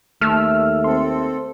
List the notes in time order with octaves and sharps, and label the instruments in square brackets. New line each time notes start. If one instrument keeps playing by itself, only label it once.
[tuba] D#2 [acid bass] A3 [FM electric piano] E6 F6
[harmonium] C4 A4 [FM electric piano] C6